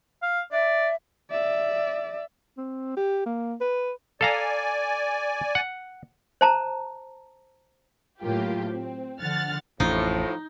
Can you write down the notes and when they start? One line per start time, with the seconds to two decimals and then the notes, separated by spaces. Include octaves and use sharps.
0.22 F5
0.52 D5 E5
1.31 D5 E5
2.57 C4
2.97 G4
3.26 A#3
3.61 B4
4.21 A4 D5 F5 G#5 A#5
5.55 F#5
6.41 C5 A5 A#5
8.21 A2 F#3 A#3 F4 G4
8.69 C4
9.21 D3 F3 F#5 F6 A6
9.80 A1 F2 A2 F3 D#4